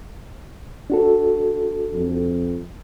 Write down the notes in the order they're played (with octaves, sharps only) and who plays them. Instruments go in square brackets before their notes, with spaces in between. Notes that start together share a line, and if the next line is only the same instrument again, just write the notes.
[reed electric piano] D4 F#4 A4
[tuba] F2